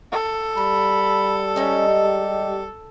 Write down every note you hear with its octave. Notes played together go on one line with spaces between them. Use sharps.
A4
G3 F#4 B5
G#3 C#4 D#4 E5
G4